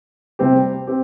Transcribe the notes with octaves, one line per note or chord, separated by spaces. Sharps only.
C3 G3 C4 G4
C4 G4